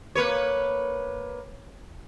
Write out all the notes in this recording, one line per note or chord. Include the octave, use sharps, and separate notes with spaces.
A#3 B4 C#5